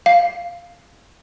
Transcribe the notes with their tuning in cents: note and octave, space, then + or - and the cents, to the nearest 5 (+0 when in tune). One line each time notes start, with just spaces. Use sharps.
F5 -5